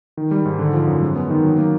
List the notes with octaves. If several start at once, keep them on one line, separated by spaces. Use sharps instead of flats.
D#3
G3
G#2
D3
F3
F#2
G#3
B3
D#3
F#3
A#3